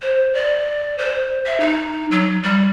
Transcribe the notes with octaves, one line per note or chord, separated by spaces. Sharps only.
C5
D5
C5
E5
D#4
F#3
G3